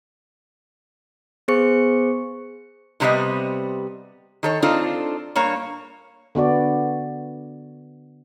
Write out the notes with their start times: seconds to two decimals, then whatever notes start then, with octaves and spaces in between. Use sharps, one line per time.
1.48 B3 G#4 C5 C#6 C#7
3.00 A2 C3 G3 B3 C4 D#5
4.43 D#3 A4 C#5
4.62 C4 D4 D#4 F4 A4
5.36 G2 A#3 C#5
6.35 D3 B3 F#4 D5